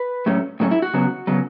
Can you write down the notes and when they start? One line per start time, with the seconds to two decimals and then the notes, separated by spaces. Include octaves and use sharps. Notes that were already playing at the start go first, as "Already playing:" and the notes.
Already playing: B4
0.26 A2 F#3 A3 C#4
0.60 A2 F#3 A3 C#4
0.71 E4
0.82 F#4
0.94 C#3 F#3 B3
1.27 C#3 F#3 B3